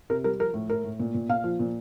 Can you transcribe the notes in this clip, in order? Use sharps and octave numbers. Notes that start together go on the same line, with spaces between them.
C3 A#4
G3 A#4
F3 A#4
A2
A2 A#4
A2
A#2
A#2
A#2 F5
F3
A#2